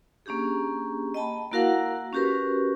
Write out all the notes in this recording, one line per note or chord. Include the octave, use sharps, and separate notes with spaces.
A#3 C#4 D4 G4 G#4
D#5 G5 A5 B5
A#3 E4 F#4 A#4 F5 F#5
C#4 F#4 G4 A#4 B4